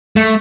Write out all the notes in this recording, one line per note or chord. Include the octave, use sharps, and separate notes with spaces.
A3